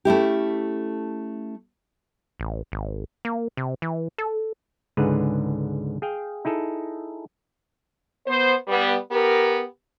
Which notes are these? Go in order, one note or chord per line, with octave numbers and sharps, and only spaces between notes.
A3 C#4 E4 G4
A1
G#1
A#3
C3
E3
A4
C#2 G#2 D3 G#4 B4
G#4 F5 G5
D#4 E4 G#4 A4
B3 C5
G3 B3
B3 G4 A#4